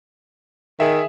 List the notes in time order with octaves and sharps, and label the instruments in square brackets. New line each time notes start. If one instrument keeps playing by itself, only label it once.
[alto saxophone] D#3 [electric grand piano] G#4 E5